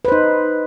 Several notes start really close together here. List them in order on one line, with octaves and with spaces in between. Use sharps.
B4 C5 D#4